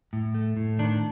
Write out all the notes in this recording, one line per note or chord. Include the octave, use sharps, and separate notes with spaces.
A2
A3
A2
D#3 D4